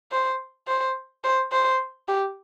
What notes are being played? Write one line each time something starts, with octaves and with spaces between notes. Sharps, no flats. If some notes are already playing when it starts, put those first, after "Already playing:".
C5
C5
C5
C5
G4